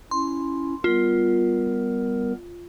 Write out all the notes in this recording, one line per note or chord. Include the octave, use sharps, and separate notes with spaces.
C#4 E4 C6
G3 B3 F4 A#4